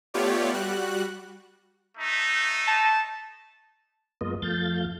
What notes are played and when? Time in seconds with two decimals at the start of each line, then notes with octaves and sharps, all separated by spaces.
0.14 A3 B3 F4 G4 C#5 D5
0.53 G3 F#4 F#6
1.98 A3 D#4
2.68 A5
4.21 F#2 G#3 A#3 B3 F4 D#5
4.42 F2 F3 A3 F5 G6 A6